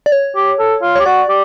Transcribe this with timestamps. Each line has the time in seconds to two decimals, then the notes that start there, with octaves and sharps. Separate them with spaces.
0.06 D5
0.12 C#5
0.35 G4
0.59 A4
0.82 F4
0.96 G4 C#5
1.05 F#4 D5
1.29 G4